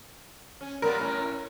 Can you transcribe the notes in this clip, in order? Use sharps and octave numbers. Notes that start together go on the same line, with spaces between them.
C#4
A#2 G3 B3 A#4
A2 C#4